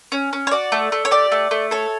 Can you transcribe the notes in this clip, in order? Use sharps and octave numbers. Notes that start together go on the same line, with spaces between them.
C#4
C#4
C#5
F#4 D5
A3
A3
C#5
G4 D5
A3
A3
A4 C#5